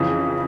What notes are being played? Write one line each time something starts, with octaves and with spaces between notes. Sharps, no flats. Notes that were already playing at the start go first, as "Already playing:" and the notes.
Already playing: F2 C#3 E3